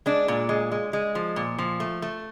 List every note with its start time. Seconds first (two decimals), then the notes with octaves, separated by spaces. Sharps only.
0.06 G#3 D4
0.28 A#2
0.49 G#3
0.72 G#3
0.93 G#3
1.15 F3
1.36 A#2
1.58 F3
1.80 A3
2.02 A3